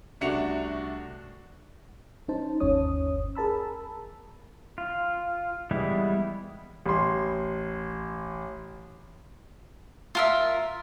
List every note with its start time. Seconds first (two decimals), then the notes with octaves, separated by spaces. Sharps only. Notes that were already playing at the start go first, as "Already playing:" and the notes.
0.21 C2 A3 D4 F#4 C#7 F7
2.28 C#4 D#4 C5 A5
2.60 G1 D#2 C#4 C#5 D#6
3.35 G#4 A#4 A5 B5 E6
4.78 F4
5.71 E3 G3 G#3 B3 E4
6.86 A1 C6
10.15 F4 A#4 E5